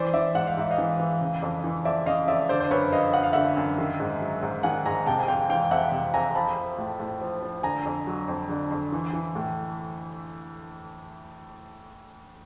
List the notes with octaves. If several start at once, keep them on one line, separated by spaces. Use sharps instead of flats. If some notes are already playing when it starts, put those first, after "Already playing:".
Already playing: E3 C5 D5
E3 D5 E5
G#2 F#5
F5
G#2 E5
D#5 F5
E3
E3
C#3
F2
E3
F2 D5 E5
C#3 D#5 F5
F2 D5 E5
D3 C5 D5
C5
F#2 B4 C#5
F3 D#5 F5
F#2 F#5
F5
D3 E5 F#5
F#2
D#3
G#2
F#3
G#2
D#3 F#5 G#5
G#2 G#5 A#5
C3 G5 A5
G#5
F2 F5 G5
E3 F5 G5
F2 E5 F#5
C3
F2 G#5 A#5
F3 A5 B5
F3
A2
A2
F3
F3
D3 G#5 A#5
F2
F#3
F2
D3
F2
E3
E3
A2